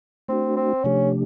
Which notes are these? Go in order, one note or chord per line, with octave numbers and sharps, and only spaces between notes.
A3 C4 D4 F#4
C4
C3 F3 A3 C#4 D4 G4